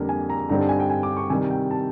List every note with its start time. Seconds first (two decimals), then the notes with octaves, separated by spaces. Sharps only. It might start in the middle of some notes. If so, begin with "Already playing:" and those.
Already playing: F2 D3 G3 A#3 D4
0.09 G#5
0.30 A#5
0.50 G2 D3 G3 C4 D#4 A#5
0.59 A5
0.69 G#5
0.80 G5
0.90 G#5
1.03 D6
1.17 C#6
1.30 C3 D#3 G3 G#5
1.50 G5
1.71 A5